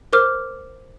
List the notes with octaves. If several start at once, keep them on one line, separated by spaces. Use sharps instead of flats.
A#4 C5 D6 F6